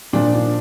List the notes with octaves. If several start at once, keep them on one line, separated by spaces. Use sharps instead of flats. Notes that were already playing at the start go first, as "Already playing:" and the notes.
A#2 F3 D4
D4